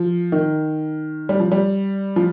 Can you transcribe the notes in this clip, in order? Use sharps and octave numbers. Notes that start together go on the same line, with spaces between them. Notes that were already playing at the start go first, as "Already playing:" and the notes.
Already playing: F3
D#3
G3
F3
G3
F3